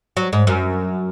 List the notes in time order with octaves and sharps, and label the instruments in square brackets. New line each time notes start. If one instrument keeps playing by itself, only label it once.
[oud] F#3
G#2
F#2